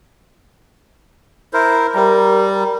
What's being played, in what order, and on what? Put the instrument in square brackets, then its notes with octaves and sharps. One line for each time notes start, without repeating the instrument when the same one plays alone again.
[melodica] E4 A#4 C5
[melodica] G3 [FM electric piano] A#4 A#5